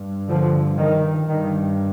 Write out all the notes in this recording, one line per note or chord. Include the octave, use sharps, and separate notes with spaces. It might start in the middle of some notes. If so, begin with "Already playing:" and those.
Already playing: G2
D3 F3
D#3
G2 D#3